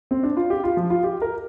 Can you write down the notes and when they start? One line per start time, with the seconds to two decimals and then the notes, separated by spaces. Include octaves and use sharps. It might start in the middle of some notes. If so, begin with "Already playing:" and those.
0.11 C4
0.23 D4
0.37 F4
0.50 G4
0.64 F4
0.77 F3
0.90 F4
1.04 G4
1.22 A#4